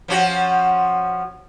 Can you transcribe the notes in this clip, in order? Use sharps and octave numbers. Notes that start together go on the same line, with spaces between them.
F3 C#4 F#4